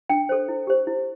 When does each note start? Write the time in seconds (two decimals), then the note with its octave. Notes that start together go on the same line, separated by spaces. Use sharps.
0.09 D4 G5
0.29 A4 C5
0.48 E4
0.67 G4 C5
0.87 E4